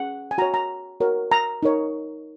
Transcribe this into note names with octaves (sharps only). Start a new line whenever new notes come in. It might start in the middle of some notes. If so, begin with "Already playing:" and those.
Already playing: C#4 G#4 F#5
G#5
F#4 C#5 A#5
A#5
F#4 A#4 C#5
A#5
D#4 A#4 C#5